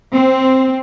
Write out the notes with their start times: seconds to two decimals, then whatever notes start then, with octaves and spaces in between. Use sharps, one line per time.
0.14 C4